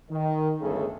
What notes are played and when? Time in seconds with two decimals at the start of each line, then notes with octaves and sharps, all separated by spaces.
0.11 D#3
0.61 G1 C#2 C#3 A3 G#4 A4